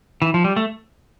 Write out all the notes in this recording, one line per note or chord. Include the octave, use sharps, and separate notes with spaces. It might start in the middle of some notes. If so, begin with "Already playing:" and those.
E3
F3
G3
A3